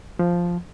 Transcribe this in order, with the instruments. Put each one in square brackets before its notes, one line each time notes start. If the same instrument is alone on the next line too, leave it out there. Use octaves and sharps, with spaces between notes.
[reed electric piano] F3